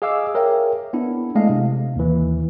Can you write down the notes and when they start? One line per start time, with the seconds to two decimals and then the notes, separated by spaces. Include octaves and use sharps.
0.02 G#4 D#5 F5 D6 E6
0.35 G#4 A#4 C#5 E5 G5
0.93 B3 D4 E4
1.35 G#3 A3 D4 D#5 F5
1.49 C3
1.96 D#2 E3